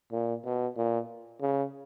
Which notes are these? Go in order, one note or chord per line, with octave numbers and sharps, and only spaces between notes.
A#2
B2
A#2
C#3